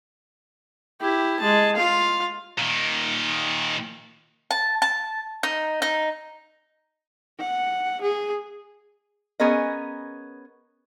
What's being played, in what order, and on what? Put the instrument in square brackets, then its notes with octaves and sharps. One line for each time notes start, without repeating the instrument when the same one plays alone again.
[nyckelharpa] E4 G4
G#3 A5
F4 F5
[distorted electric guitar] A#2 D#3
[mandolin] A5
A5
D#4
D#4
[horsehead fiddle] F#5
G#4
[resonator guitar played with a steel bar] B3 C#4 G#4 A#4 D#5